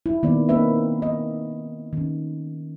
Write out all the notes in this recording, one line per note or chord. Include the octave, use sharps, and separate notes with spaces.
E4
D#3 A#3 B3 D5
A#3 C4 D#4 B4 E5
D#5
D#3 C#4